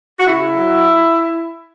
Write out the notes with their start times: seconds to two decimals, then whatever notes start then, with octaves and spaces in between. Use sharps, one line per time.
0.19 F#4
0.26 C#3 E4
0.55 F#3